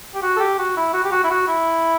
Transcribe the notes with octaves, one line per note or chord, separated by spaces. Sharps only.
G4
F#4
A4
G4
F#4
E4
F#4
G4
F#4
E4
F#4
E4